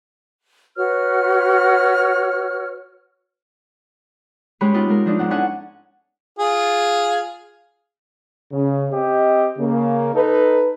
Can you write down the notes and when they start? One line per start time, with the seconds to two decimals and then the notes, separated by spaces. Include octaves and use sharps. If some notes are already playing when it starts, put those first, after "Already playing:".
0.76 F#4 B4 C#5 F6
4.61 G#3 C#4 G4 B4 C#5 B5
4.74 B3 C4 D#4 F4 B4
4.89 G#3 A#4
5.06 F3 D4 D#4
5.19 G#2 B3 C4 F#5
5.30 C#4 D4 E4 A4 F#5 G#5
6.39 F4 G#4
8.51 C#3
8.91 C4 G4 D#5
9.58 C#3 A#3
10.14 D#4 A4 B4